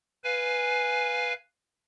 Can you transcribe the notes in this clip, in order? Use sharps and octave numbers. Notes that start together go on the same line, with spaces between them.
B4 F5 G#5